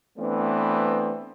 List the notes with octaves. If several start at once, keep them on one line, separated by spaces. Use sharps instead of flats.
E3 A3 B3 C4 D4